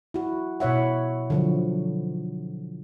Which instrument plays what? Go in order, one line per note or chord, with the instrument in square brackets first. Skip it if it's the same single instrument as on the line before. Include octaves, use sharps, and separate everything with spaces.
[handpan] E4 F#4
B2 E4 C#5 E5 F#5
D3 F3 F#3